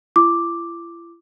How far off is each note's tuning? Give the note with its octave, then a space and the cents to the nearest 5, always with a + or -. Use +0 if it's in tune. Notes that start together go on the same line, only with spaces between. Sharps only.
E4 +45 D6 +0